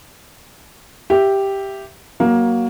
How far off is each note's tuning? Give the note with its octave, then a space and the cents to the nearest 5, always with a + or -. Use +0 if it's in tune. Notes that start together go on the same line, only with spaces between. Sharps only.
G4 +0 E5 +10
F#3 +15 A#3 +15